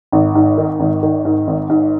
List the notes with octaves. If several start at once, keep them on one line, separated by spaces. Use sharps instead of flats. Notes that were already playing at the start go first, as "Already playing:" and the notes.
G#1
G#2
D#3
G#1
D#3
G#2
G#1
G#2